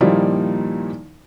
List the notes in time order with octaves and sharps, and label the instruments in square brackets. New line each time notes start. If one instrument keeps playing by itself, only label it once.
[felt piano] A#2 D#3 F3 G3 A#3 E4